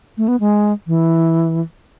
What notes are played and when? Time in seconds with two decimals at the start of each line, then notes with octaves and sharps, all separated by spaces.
0.18 A3
0.28 B3
0.40 G#3
0.87 E3